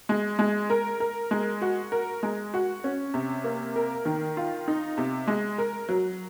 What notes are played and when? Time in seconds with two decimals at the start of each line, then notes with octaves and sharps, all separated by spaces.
0.09 G#3
0.39 G#3
0.70 A#4
1.00 A#4
1.31 G#3
1.62 F#4
1.92 A#4
2.23 G#3
2.54 F#4
2.84 C#4
3.14 C3
3.44 A#3
3.76 A#4
4.05 D#3
4.37 F4
4.68 D#4
4.98 C3
5.28 G#3
5.58 A#4
5.89 F#3